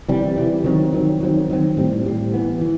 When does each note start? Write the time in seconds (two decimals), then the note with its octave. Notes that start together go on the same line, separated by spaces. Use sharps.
0.08 C3 E3 G3
0.36 C3 E3 G3
0.64 D#3 F#3 C4
0.93 D#3 F#3 C4
1.20 D#3 F#3 C4
1.50 D#3 F#3 C4
1.77 A2 G3 C4
2.05 A2 G3 C4
2.34 E3 B3
2.61 E3